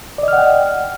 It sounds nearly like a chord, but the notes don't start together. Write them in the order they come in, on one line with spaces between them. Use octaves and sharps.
D5 D#5 F6 F#5 G5